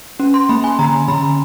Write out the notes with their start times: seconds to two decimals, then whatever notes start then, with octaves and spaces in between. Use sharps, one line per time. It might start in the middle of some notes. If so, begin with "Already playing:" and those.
0.20 C#4
0.34 C6
0.49 A#3 B5
0.64 G#5
0.79 D3 A#5
1.08 D3 B5